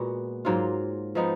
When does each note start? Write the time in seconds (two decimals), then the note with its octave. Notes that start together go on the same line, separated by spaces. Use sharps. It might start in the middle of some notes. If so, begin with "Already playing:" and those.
Already playing: A#2 G#3 B3 F#4
0.45 G#2 F#3 A#3 F4
1.15 F3 G#3 B3 D#4